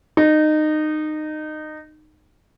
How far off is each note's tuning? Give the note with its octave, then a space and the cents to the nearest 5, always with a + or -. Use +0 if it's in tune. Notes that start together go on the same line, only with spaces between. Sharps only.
D#4 -20